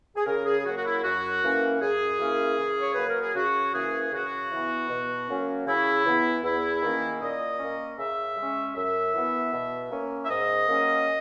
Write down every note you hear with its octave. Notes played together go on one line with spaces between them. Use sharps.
G#4
C#3 A#4
G#4
F#3 A#3 F#4
F#4
E4
F#2 F#4
E3 A#3 C#4
F#2 G#4
E3 A#3 C#4
C#3
C#5
F#3 A#3 B4
A#4
G#4
C#3 F#4
E3 A#3 C#4 G#4
C#3 F#4
E3 B3
B2
F#3 A#3 C#4
C#3 E4
E3 B3
E2 E4
D#3 A#3 C#4
A#2 D#5
A#3 C#4
C#3 E5
G#3 C#4
F#2 E5
E3 B3
B2
A#3 C#4
E5
G#2 D#5
F#3 A#3 C#4